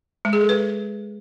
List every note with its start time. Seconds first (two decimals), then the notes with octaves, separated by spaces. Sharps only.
0.25 G#3
0.33 G#4
0.41 A4
0.49 B4